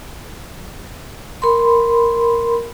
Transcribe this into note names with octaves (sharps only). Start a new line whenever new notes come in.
A#4 B5 C6